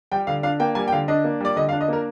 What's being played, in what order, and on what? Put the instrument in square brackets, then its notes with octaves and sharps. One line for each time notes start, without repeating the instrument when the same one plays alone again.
[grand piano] G3 [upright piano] G5
[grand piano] D3 [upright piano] F5
[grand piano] D4 [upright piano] F5
[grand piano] A#3 [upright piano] G5
[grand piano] G3 [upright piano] G#5
[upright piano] G5
[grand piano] D3 [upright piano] F5
[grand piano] D4 [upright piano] D#5
[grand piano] A#3
[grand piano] G3 [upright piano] D5
[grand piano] D3 [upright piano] D#5
[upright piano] F5
[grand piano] D4
[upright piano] D#5
[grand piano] A#3 [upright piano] A#4